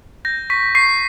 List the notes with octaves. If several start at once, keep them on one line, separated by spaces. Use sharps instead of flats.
G6 A#6
C#6 B6
C#6 C7